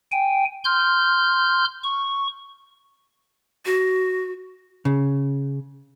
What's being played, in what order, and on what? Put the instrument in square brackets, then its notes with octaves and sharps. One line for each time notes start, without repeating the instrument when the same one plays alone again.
[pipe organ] G5 G#5
C6 F6 G6
C#6
[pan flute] F#4
[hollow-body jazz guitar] C#3